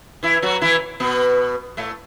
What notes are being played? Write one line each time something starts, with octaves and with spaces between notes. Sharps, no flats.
E3 E4
F#3 F#4
E3 E4
B2 B3
A2 A3